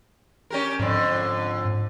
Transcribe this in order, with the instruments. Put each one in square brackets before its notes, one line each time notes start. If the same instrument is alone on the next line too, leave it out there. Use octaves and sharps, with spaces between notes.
[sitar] C#4 G4 A#4
[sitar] F2 D3 [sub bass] G#2